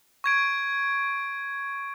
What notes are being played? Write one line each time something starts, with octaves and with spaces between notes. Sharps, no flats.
C#6 G#6 D7